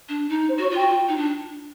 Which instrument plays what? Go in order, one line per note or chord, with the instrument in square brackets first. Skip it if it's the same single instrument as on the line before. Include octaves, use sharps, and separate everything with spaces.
[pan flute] D4
D#4
[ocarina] C5
[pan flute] F#4 [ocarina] C#5
[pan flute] F4
[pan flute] F#4 [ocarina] G5
[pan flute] F4
D#4
D4